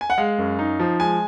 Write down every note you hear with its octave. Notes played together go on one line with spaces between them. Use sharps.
G#5
F#5
G#3 F5
F#2
D#4
F3
G#3 G#5